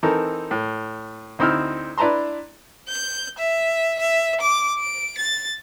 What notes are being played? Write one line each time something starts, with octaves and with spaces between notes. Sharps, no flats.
E3 C4 D#4 A4 A#4
A2
D2 C4 D#4 E4 E6 F6
D4 E4 B4 A5 A#5 C6
G6
E5
E5
D6
D7
A6